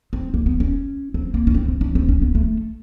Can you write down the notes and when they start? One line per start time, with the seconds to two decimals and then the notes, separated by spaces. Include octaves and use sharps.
0.13 C4
0.34 A#3
0.46 B3
0.60 C#4
1.14 C4
1.34 A#3
1.47 C#4
1.54 C4
1.68 C4
1.81 C#4
1.95 C4
2.09 C#4
2.22 B3
2.35 A3